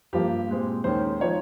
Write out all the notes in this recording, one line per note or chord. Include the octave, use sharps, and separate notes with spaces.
G2 F3 A#3 G4
A#2 G#3 C4
D#2 D#3 G#3 C#4 C5
F3 G#3 D#4 C#5